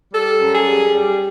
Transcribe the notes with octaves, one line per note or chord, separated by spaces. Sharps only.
G3 A4
F#2
G#4
G3
G3